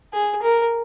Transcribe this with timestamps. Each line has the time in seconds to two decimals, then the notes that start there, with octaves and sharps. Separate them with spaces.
0.13 G#4
0.42 A#4